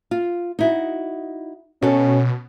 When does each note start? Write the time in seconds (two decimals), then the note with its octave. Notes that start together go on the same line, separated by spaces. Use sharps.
0.11 F4
0.59 D#4 E4 F#4
1.82 B2 C#4 F#4 A4